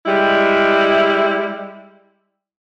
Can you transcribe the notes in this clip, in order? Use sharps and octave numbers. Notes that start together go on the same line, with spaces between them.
G3 G#3 E4